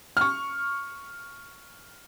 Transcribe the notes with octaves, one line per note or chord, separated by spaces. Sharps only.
C#6 F6